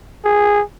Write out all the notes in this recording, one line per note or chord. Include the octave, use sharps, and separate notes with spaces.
G#4